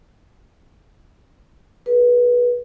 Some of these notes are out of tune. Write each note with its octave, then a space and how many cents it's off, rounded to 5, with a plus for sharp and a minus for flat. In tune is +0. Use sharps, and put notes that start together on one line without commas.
G#4 +35 B4 -20